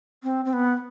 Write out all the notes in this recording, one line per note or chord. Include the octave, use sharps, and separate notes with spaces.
C4
C4
B3